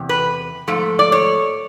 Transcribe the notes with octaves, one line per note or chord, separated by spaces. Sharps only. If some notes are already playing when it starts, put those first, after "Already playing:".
Already playing: E2 C3
B4
G#2 F3 A3
D5
C#5